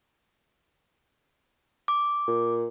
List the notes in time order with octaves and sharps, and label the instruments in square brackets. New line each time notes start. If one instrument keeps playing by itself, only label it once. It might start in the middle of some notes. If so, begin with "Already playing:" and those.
[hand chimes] D6
[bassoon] A#2